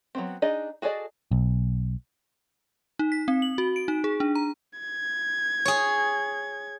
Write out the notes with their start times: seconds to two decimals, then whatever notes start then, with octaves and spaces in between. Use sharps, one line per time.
0.15 F#3 B3 C4
0.42 D4 D#4 G#4 D5 D#5
0.82 F#4 G#4 A4 D5 D#5
1.31 B1
2.99 D#4
3.12 B6
3.28 C4
3.42 F#7
3.58 F#4
3.76 D7
3.88 D#4
4.04 G#4
4.20 D4
4.35 A#5
4.79 G#6
5.65 G#4 C#5